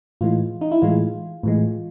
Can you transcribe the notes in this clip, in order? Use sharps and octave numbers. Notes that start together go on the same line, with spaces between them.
A2 E3 G#3 F4
D#4
E4
A2 E3 G#3 F4
A2 E3 G#3